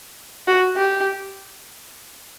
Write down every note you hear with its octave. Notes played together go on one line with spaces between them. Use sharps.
F#4
G4